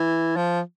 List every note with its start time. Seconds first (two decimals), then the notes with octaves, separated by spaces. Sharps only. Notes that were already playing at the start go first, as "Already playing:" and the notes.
Already playing: E3
0.36 F3